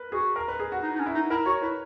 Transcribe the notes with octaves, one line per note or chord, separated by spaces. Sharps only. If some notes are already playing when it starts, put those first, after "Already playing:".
Already playing: A#4 B4
F#4 G#4
A#4
B4
G#4
F#4
D#4
D#4
C#4
E4
D#4
E4 A#4
F#4 C#5
E4 B4